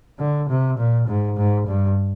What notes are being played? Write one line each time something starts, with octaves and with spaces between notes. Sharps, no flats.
D3
C3
A#2
G#2
G#2
G2